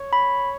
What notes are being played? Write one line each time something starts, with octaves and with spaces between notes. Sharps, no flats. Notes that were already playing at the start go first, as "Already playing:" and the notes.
Already playing: C#5
B5